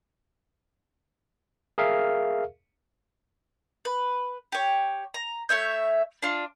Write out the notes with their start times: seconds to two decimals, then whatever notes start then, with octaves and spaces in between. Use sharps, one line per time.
1.78 G#4 A#4 E5 F5
3.85 B4
4.52 G4 C#5
5.14 A#5
5.49 A3 C#5 E5 G6
6.22 D4 F4